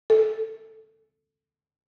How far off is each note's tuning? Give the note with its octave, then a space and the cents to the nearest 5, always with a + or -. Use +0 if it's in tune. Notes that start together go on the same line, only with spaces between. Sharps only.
A4 +5